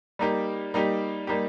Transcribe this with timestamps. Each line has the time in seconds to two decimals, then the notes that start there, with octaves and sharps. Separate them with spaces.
0.19 G3 A#3 D#4 G4
0.74 G3 A#3 D#4 G4
1.27 G3 A#3 D#4 G4